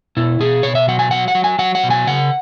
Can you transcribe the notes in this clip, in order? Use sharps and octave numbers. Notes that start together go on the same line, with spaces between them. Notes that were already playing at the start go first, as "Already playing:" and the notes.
B2 E4
B2 G#4
B2 C#5
E5
F#3 F#5
G#5
F#3 F#5
F#5
F#3
G#5
F#3 F#5
F#5
B2
G#5
C#3 F#5